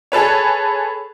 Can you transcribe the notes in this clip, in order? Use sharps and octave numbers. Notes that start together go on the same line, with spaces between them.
G#4 A4 B4 C#5